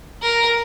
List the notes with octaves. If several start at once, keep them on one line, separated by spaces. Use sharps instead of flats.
A#4